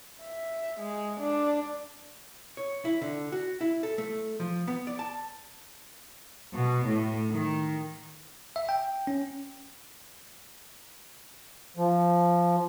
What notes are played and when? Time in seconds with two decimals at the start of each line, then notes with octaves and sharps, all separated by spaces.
0.21 E5
0.80 G#3
1.21 D4
2.57 C#5
2.85 E4
3.01 D3
3.32 F#4
3.61 E4
3.83 A4
3.98 A3
4.40 F3
4.67 B3
4.87 D5
4.99 A5
6.54 B2
6.86 A2
7.32 D#3
8.56 E5
8.69 G5
9.07 C#4
11.77 F3